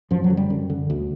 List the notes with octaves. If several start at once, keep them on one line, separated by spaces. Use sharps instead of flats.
F#2 F3
F#3
D3
G3
F#2
D3
D2